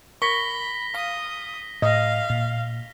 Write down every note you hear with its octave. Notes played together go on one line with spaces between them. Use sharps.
A#4 B5 C#6 A#6 B6 G7
F5 D#6
A2 D#5 F5
A#2